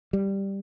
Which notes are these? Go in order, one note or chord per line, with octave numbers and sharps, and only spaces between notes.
G3